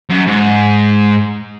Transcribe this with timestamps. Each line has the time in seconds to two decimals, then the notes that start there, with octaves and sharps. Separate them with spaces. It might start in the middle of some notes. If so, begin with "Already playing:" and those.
0.10 F#2
0.27 G#2